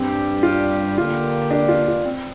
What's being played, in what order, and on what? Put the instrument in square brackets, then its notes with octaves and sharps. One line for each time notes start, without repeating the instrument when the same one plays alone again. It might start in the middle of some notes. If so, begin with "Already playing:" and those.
Already playing: [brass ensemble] G2 G3 D4 G4 [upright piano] C4
[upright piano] F4
[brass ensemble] D3 A#3 G4 [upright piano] F4
[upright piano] D4
F4
F4
C4